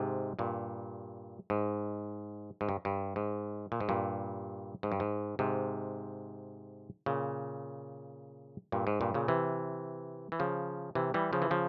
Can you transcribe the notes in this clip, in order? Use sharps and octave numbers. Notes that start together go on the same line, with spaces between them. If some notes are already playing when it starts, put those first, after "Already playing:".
Already playing: G#2 C3
G2 A#2
G#2
G#2
G2
G2
G#2
A#2
G#2
G2 A#2
G#2
G2
G#2
G#2 C3
A#2 C#3
G2 A#2
G#2
G2 A#2
A#2 C#3
C3 E3
E3
C#3 F3
C3 E3
E3 G3
C#3 F3
E3
C#3 F3